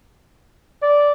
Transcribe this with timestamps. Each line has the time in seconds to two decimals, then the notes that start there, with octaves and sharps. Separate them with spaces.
0.82 D5